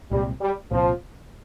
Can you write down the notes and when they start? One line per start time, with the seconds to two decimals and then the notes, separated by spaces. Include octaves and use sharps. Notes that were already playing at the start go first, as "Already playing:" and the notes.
0.11 C2 A#2 G3 G#3 C4
0.41 G3
0.71 C2 A#2 F3 G#3 C4